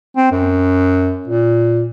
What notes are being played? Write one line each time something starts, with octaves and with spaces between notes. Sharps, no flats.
C4
F#2
A#2